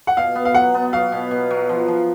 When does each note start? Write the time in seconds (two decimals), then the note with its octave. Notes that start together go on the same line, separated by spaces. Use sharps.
0.07 F#5
0.17 B2 F5
0.35 B3
0.45 F5
0.54 F#3 F#5
0.74 B3
0.93 F#3 F5
1.12 B2
1.31 B2
1.50 F#3
1.69 F3
1.88 F3